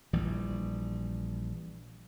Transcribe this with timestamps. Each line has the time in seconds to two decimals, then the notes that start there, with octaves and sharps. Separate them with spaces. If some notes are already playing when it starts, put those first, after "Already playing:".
0.13 A#1 E3 G3